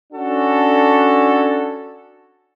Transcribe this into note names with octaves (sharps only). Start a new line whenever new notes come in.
C#4 D4 F#4 A4